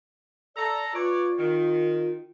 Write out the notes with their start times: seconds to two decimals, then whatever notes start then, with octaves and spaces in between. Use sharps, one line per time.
0.56 A4 D5 A#5
0.94 F4 B4 C#5 D5
1.38 D#3